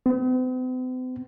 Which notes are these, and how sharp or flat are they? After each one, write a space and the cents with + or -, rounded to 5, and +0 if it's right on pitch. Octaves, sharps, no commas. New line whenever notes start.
C4 -45